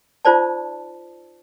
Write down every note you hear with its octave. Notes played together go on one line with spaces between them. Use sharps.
D#4 F4 C5 D5 A5